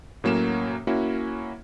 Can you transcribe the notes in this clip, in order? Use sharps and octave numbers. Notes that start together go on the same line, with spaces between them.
A2 F#3 A#3 C#4 E7
A#3 C#4 E4 F#4